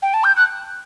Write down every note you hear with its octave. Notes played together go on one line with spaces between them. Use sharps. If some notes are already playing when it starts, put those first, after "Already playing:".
G5
A5
G6
F#6